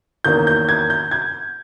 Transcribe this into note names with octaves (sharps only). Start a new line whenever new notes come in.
E2 D#3 A#3 C#4 G6
G6
G#6
G6
G#6